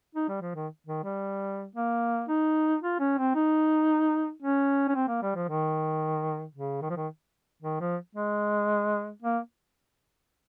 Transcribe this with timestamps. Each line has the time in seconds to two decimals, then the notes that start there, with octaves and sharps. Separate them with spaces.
0.15 D#4
0.28 G3
0.41 F3
0.55 D#3
0.86 D#3
1.04 G3
1.75 A#3
2.28 D#4
2.82 F4
3.00 C#4
3.18 C4
3.35 D#4
4.42 C#4
4.88 C#4
4.95 C4
5.08 A#3
5.22 G3
5.35 F3
5.48 D#3
6.55 C#3
6.82 D#3
6.90 F3
6.97 D#3
7.62 D#3
7.80 F3
8.15 G#3
9.22 A#3